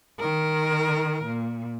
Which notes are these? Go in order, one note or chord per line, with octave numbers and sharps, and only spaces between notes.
D#3 A#4
A#2